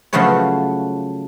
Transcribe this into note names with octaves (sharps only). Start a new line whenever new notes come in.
C#3 F3 F#3 A3 B4 C#5